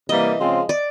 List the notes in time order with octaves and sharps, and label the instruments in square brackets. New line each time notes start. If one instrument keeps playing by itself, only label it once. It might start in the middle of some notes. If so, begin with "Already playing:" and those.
[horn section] C3 E3 G3 A#3 [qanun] D#5
[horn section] C#3 F3 G#3 C4 F4
[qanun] D5